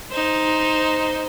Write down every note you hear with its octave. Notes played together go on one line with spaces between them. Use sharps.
D#4 C5